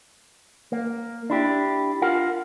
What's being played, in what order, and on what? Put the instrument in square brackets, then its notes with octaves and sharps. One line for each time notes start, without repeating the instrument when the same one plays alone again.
[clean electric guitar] A#3
D4 E4 G4
F4 A#4 F5 F#5